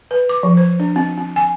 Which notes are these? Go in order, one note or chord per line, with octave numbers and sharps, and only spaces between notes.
B4
D6
F3
C5
D4
C4
C4
G#5